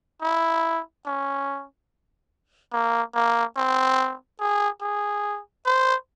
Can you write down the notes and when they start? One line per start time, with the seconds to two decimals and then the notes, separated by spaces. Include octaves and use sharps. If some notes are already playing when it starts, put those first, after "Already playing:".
0.22 E4
1.06 C#4
2.73 A#3
3.15 A#3
3.56 C4
4.40 G#4
4.81 G#4
5.66 C5